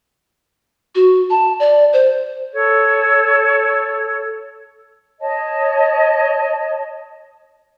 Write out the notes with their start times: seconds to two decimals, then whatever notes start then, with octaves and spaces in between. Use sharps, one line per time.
0.95 F#4
1.30 A5
1.60 D5
1.93 C5
2.53 A4 C#5
5.20 C#5 D#5 A5